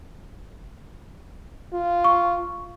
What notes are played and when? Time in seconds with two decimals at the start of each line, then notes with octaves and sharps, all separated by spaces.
1.73 F4
2.04 C#6